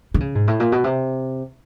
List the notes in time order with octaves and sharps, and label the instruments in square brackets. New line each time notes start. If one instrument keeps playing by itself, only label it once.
[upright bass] D3
C#3
G#2
A2
A#2
B2
C3